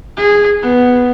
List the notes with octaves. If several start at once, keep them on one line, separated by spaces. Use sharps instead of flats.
G#4
B3